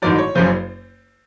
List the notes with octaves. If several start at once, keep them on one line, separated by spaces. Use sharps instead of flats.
A1 G#2 D#3 F#3 D5
C#5
F#1 F#2 C#3 C5